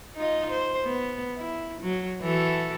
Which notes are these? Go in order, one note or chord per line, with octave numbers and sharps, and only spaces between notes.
D#4 F4 D#5
C5
B3
E4
F#3
E3 F#4 A4